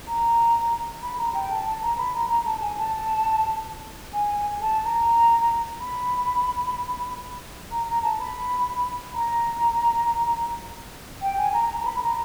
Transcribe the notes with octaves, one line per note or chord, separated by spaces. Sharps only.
A#5
B5
A#5
G5
A5
A5
A#5
B5
A#5
A#5
A5
G#5
A5
G#5
G#5
A5
A#5
B5
A#5
A#5
A5
B5
A#5
G5
G#5
A#5
A#5
A#5
B5
A#5